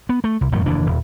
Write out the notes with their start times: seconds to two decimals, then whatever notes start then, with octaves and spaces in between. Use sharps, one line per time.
0.09 B3
0.24 A3
0.41 C2
0.52 D#1 F#2 A2 A3
0.66 F1 D#2 E3 D4
0.86 D#1